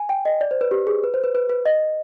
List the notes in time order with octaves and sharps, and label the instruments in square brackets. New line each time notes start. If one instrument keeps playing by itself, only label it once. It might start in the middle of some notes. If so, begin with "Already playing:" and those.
Already playing: [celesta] G#5
G5
D#5
D5
C5
B4
G4
G#4
B4
C5
B4
B4
B4
D#5